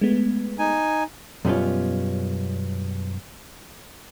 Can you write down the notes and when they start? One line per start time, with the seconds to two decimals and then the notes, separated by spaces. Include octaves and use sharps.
0.01 G#3 A3 B3
0.59 D#4 G#5
1.45 F#2 B2 G3 B3 C#4 F4